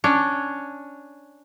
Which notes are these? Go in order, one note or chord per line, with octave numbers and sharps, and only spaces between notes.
C#4 D4 C#5